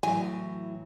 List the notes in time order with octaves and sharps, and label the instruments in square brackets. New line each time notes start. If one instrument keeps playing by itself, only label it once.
[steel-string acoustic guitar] A2 E3 F#3 [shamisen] G#5